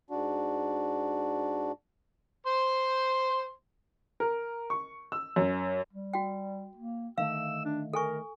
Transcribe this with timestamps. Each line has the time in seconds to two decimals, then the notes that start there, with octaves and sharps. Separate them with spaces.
0.11 G#2 D4 F#4
2.46 C5 C6
4.20 A#4
4.70 C#6
5.12 E6
5.36 F#2
5.93 G3
6.13 F#4 G5
6.77 A#3
7.18 D3 D#3 A3 F5 E6
7.65 D4
7.93 A4 A#4 G#5 C#6